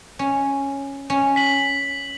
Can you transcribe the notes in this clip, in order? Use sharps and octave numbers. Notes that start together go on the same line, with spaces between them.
C#4
C#4
B6 F#7